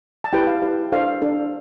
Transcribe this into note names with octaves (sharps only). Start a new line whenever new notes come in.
A5
E4 G4 B4 G5
F5
E4 G4 B4
D4 A4 C5 F5
D4 A4 C5